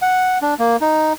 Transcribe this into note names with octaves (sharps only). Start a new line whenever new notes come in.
F#5
D4
A#3
D#4